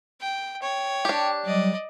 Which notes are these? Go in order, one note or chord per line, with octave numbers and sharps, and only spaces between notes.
G5
C#5 G5
D4 G4
F#3 G3 D5 D#5